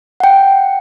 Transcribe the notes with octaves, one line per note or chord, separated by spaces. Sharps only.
F#5 G5